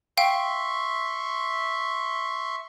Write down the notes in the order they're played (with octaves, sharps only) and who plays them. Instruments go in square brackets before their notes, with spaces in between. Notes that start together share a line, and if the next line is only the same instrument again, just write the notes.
[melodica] E5 C6 C#6 [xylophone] F5 G5